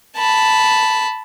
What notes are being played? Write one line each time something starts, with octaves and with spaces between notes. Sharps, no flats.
A5 B5